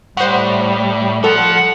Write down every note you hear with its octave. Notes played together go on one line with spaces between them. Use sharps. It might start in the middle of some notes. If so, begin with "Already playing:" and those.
A2 G3 C5 F#5
F3 A4 F#5